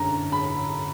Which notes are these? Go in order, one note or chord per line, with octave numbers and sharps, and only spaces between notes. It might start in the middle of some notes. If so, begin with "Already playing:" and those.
Already playing: F#2 D3 A#5
B5